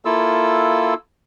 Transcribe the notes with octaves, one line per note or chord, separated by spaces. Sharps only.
A#3 E4 F4 A4 E6